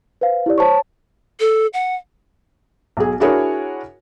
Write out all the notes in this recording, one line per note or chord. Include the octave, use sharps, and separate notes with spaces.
B4 C5 F5
E4 G4 D5
C5 C#5 A5 C#6
A4
F#5
B1 G#4
D4 E4 F#4 G#4 A#4 C#5